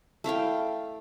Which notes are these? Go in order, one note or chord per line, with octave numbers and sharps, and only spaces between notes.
A3 E4 F5 G5